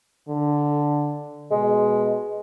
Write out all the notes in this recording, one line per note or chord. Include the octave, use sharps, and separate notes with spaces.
D3
B2 G#3